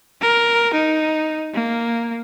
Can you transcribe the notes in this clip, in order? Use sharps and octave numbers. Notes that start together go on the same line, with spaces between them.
A#4
D#4
A#3